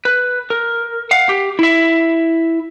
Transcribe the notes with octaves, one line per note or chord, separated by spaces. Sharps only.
B4
A#4
F5 F#5
G4
E4 E5